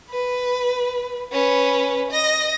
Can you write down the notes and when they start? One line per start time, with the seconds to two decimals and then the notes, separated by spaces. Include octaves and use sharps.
0.10 B4
1.32 C#4 B4
2.10 D#5 A#6